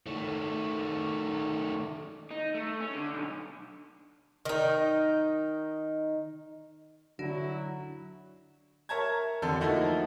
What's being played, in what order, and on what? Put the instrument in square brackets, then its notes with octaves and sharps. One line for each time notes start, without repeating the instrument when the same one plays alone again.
[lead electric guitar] D#3 A3
[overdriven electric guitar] D#4
A3
C#4
D3
B1
[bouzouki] D#3 D#4
[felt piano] D3 [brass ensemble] F#3 E4 [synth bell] F#4
[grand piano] A#4 C#5 E5 A5 A#5 G#6
F2 D3 A4
F3 A3 A#3 D#4 E4 F#4